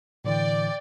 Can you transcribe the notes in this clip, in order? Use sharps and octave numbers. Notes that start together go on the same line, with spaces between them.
A2 D3 E3 D5 G5